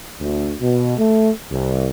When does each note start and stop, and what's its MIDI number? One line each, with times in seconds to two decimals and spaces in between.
0.20 0.53 38
0.61 0.98 47
0.98 1.31 57
1.52 1.88 36